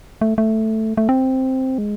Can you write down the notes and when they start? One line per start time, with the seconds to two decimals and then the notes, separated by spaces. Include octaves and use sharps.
0.21 A3
0.38 A3
0.97 A3
1.09 C4
1.78 G#3